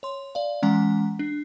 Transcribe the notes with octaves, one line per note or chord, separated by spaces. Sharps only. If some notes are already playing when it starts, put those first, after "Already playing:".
C#5 C6
D5 F5
E3 G#3 C#4 F#5 A#5
D4